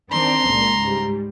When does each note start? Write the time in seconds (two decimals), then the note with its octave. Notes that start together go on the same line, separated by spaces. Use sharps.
0.12 D#3 C4 D4 A#5 C6
0.46 C#2 A#2
0.84 G#2 G3